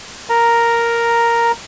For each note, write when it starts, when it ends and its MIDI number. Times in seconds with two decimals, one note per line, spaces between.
0.29 1.52 70
0.29 1.52 82